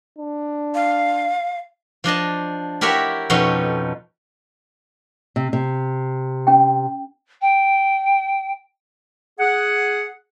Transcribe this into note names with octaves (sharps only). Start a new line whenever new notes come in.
D4
F5
F3 D4 D#5 A5
E4 G4 A#4 C#5 E5 F#5
F2 B2 B3 C#4 D#4 A4
C3
C3
C#4 G5
G5
G#4 F#5